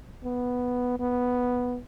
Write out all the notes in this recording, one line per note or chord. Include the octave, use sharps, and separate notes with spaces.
B3
B3